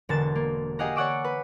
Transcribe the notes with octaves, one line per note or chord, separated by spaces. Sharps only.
E1 D3 A#4 A6 E7
A#3
G4 G#4 D#5 F5 F#5 A#5
C#5 D5 F#5 C#6 D6 E6
B4